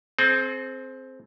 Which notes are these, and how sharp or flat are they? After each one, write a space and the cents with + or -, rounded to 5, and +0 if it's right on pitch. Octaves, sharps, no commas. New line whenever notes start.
C4 +0 G#4 +45